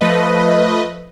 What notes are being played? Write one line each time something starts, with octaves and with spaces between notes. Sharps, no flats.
F3 A3 B4 D#5